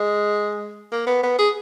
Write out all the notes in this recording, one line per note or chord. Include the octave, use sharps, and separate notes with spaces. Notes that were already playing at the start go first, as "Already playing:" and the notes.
Already playing: G#3
A#3
B3
B3
G#4